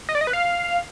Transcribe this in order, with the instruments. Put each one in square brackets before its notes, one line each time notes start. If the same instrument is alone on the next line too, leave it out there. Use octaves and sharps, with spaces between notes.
[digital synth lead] D#5
D5
D#5
B4
F5